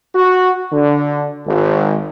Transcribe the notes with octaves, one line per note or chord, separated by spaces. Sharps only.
F#4
D3
G#1